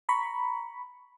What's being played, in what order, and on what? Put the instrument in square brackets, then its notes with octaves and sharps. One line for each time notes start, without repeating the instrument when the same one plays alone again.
[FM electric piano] A#5 B5 C#6